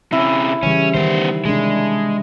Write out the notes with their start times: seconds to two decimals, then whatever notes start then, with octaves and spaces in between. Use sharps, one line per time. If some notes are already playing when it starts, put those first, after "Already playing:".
0.12 C3 C#4 E4
0.63 C#3 E3 G3 C#4
0.95 D#3 G3 B3 C5
1.45 C3 G#3 D4